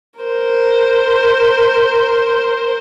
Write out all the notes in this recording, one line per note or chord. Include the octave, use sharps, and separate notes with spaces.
A#4 C5